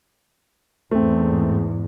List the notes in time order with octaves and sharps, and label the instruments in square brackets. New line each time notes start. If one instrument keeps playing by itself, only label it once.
[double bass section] E2 G#2 [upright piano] A3 C4